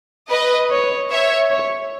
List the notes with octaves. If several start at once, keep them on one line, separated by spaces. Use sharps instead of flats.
B4 D#5
C#5
C#5 E5
C#5